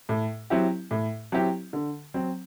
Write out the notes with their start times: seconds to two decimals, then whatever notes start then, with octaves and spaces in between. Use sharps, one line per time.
0.09 A2
0.50 F#3 C4 E4 G4
0.91 A2
1.32 F#3 C4 E4 G4
1.73 D3
2.14 F#3 C4